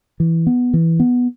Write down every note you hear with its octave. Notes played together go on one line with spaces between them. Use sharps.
E3
B3
E3
B3